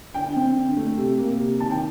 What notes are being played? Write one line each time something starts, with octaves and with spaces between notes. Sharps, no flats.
D3 G5
C4
D3
A3
C3
A#3
C3
D#3 A5
G5